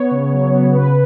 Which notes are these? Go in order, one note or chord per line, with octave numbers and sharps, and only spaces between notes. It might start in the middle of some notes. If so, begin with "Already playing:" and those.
Already playing: B3 C#5
C#3
F#3
B3
C#3 B4